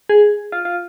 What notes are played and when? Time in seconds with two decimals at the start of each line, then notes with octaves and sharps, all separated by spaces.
0.09 G#4
0.52 F4
0.65 F4